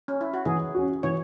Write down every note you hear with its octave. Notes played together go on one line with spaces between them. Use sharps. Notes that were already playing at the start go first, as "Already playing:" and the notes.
C#4
E4
F#4
E3 G#4
C#4 F#4
E3 C#5